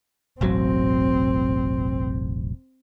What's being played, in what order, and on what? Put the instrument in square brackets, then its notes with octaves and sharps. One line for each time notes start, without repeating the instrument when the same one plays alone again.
[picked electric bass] E1 A1 F#3 [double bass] C4